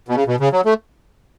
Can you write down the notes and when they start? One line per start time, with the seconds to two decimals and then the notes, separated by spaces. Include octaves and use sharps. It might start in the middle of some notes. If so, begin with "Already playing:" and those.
0.09 B2
0.15 C#3
0.27 B2
0.40 C#3
0.52 F#3
0.65 A3